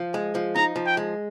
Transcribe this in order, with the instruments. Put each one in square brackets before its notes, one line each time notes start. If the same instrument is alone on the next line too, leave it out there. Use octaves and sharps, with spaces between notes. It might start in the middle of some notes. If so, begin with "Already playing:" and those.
Already playing: [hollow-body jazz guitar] F3
G#3
F3
[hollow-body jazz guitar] D#4 [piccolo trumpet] A#5
[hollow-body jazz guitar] F3
[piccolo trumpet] G5
[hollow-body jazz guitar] G#3